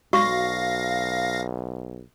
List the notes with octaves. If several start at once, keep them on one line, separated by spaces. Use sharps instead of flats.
B1 F#4 D5 F5 C#6 A#6